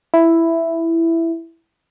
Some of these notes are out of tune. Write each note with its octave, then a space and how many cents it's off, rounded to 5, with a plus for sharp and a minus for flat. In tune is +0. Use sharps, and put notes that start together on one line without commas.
E4 +5